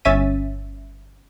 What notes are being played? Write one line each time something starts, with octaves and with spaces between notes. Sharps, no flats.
G1 C#4 E5 A6 B6 D#7